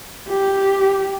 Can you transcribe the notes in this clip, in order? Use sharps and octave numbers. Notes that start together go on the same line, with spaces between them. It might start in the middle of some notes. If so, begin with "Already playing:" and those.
G4